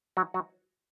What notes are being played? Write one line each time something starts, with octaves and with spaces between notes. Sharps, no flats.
F#3 F#4
F#3 F#4